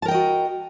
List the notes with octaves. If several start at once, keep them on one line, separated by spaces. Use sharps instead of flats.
F#4 A#4 D#5 G5 A5